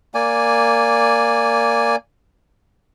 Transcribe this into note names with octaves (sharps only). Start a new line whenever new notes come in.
A#3 D5 G#5